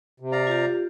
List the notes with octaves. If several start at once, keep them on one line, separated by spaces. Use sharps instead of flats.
C3
D5 F5 A#5
F4 G4